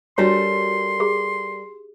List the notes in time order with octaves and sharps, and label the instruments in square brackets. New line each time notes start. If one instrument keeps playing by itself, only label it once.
[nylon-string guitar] G3 A4 A#4 [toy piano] D4 F#4 C#5 [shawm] C6
[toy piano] G4 G#4